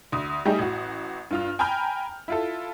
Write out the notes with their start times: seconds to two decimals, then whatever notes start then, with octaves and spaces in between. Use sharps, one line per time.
0.12 D2 D#6
0.46 G3 A3 D#4 G4 G#4
0.59 A1 F#4
1.31 G2 F4 F6
1.59 G5 G#5 A#5 B5 F6 G6
2.28 E4 F4 A4